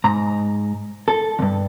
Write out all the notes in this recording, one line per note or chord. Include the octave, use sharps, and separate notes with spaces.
G#2 A#5
A4
E2 G2